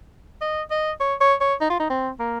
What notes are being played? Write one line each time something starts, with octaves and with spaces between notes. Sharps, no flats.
D#5
D#5
C#5
C#5
C#5
D#4
F4
D#4
C4
A#3